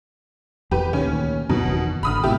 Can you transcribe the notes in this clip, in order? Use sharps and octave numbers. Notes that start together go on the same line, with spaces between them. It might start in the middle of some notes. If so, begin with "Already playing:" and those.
D#1 E2 G4 B4
D2 A#2 D#3 C#4
F#2 B2 E3
F#1 E2 D#3
G#1 D3 B5 D#6 F6
G#2 B2 E4 G4